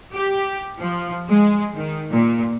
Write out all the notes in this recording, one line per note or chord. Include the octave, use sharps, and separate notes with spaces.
G4
F3
G#3
D#3
A#2